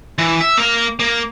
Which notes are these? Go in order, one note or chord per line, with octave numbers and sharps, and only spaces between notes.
E3
E5
A#3 F5
A#3